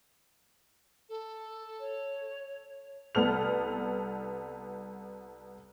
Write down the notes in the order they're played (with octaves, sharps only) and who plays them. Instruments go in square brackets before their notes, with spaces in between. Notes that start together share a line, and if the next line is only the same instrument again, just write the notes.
[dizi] A4
[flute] C#5
[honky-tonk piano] C2 B3 A4 F6 F7